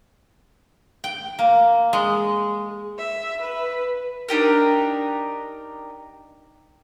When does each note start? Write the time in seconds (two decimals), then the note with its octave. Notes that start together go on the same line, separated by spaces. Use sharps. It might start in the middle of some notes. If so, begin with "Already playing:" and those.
1.04 G5
1.39 A#3
1.93 G#3
2.98 E5
3.41 B4
4.28 D4 D#4 G4 A#4